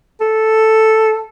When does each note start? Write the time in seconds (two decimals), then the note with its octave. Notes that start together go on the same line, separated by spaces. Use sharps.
0.21 A4